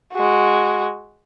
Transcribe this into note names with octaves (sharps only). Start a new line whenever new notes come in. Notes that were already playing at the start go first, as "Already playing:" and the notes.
G#3 F#4